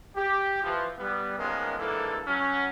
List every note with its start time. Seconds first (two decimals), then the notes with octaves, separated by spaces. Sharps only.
0.16 G4
0.64 E3 F3
0.98 G3 B3
1.39 D#3 F3 G#3 A#3 B3 C#4
1.78 G#2 D3 E3 A#3 A4
2.28 F#3 C#4